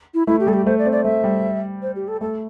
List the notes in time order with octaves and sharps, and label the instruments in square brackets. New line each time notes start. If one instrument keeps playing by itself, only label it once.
[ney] E4
[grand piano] A3 [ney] E4
[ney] G4
[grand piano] G3 [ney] A4
[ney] G4
[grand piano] A3 [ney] C5
[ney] D5
[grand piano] C4
[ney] D5
[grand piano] A3 [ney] E5
[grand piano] G3
[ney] C5
G4
A4
[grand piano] A3 [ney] A4